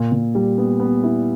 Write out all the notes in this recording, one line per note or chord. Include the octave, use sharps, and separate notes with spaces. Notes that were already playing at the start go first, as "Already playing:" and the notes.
Already playing: A#2
A#2
G3
B3
B3
E4